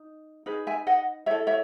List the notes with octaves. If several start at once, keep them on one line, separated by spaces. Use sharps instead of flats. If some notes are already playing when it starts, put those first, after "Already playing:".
Already playing: D#4
D#4 G#4 B4
E5 G#5
D#5 F#5
E4 A4 C#5 E5
C#5 E5